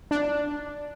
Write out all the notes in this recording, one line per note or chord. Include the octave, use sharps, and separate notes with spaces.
D4